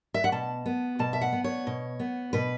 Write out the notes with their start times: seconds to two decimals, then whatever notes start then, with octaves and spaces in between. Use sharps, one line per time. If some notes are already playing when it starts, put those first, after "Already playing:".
0.14 E5
0.24 F#5
0.32 B2 A5
0.66 B3
0.99 B2 A5
1.13 E5
1.21 F#5
1.33 B3
1.44 C#5
1.67 B2
2.00 B3
2.33 B2 B4